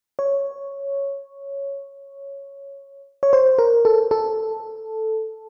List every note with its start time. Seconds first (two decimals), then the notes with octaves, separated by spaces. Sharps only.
0.19 C#5
3.23 C#5
3.33 C5
3.59 A#4
3.85 A4
4.11 A4